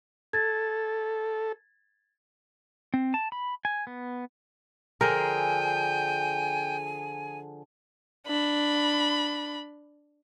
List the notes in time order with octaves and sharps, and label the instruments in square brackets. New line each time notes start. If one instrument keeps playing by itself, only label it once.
[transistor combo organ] A4 [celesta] G#6 A6
[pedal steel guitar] C4
A5
B5
G#5
B3
[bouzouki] D3 F3 G#4 [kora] A#4 [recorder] G5 [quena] G#5
[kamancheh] D4 B5